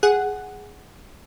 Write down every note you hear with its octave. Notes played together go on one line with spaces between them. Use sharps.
G#4 F#5